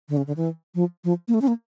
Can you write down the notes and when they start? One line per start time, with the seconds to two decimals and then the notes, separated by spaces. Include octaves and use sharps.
0.09 D3
0.17 C#3
0.27 D3
0.37 E3
0.75 F3
1.04 F3
1.28 A#3
1.34 A3
1.42 C#4
1.48 A#3